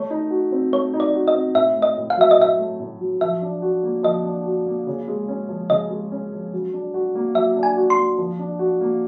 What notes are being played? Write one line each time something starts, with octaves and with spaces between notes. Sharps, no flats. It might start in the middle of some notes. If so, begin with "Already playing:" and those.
Already playing: A3 C#5
D#4
F#4
C4
A3 C#5
D#4
D5
F#4
D#5
C4
A2 E5
A3
D#5
A2
F5
F#3 E5
D#5
A2 E5
A3
A2
F#3
F3 E5
D4
F#4
A#3
F3 D#5
D4
F#4
A#3
C#3
G#3
C#4
F3
C#3 D#5
G#3
C#4
F3
F#3
D4
F#4
A#3
F#3 E5
D4
G#5
F#4
C6
A#3
F3
D4
F#4
A#3